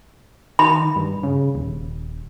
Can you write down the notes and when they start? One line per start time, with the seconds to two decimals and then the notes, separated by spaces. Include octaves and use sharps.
0.59 D#3 B5
0.96 G2
1.23 C#3
1.55 D#1